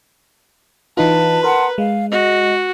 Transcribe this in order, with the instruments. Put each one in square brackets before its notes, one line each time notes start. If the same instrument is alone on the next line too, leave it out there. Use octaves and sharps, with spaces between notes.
[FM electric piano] E3 D#4 F4 [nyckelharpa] B4 [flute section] A5
[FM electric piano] A#4 [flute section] F#5 A5 C6
[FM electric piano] G#3 [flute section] F5
[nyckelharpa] F#4 [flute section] D#5